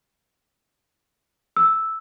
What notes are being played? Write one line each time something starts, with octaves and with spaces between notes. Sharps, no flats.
E6